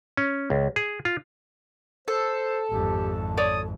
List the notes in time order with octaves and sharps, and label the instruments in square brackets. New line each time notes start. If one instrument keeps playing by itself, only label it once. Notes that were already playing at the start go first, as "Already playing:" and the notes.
[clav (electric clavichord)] C#4
C#2
G#4
F4
[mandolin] A4 [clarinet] C5
[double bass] G#1 F2 [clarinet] G4
[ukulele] C#5 D5 [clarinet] D#6